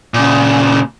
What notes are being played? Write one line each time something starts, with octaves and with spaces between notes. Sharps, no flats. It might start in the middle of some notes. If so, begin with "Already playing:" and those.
A#2 C#3